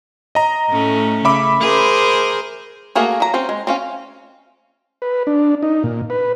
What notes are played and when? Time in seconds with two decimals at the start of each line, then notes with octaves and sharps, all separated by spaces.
0.35 D#5 A#5
0.69 A2 A3 C#4
1.25 C#3 E5 B5 D6
1.60 G#4 A#4 C5
2.95 A3 A#3 F#4 G#4 A#4
3.20 F#3 A#5
3.34 C4 C#4 C5
3.49 G#3
3.67 C4 C#4 F5
5.02 B4
5.27 D4
5.63 D#4
5.84 A#2
6.10 B4